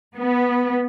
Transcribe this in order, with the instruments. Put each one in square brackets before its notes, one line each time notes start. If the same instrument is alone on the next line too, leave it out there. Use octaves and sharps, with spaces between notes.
[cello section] B3